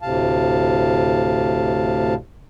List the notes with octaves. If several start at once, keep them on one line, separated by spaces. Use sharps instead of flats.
D2 A2 C3 F5 A5